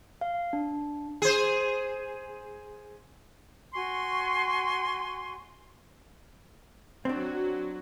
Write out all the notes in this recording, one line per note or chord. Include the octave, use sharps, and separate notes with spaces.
F5
D4
G#4 C5
F#4 G#5 C6 C#6
F#3 C4 D4 F#4